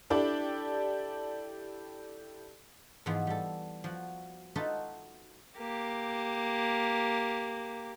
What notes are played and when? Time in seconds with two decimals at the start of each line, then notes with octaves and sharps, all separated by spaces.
0.10 D4 E4 G4 A4 D5
3.06 G#2 E3 F3 G#3 B3 F4
3.27 G3 A4
3.84 F3 F#4
4.56 D#4 F4 F#4 A4 B4 E5
5.59 A#3 G4